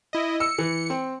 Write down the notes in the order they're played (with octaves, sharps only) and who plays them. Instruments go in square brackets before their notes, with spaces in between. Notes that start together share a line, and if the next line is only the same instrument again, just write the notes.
[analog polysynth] E4 D#5
[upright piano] E6 [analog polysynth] C#7
[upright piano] E3
C4